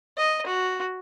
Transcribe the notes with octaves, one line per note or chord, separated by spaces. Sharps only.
D#5
F#4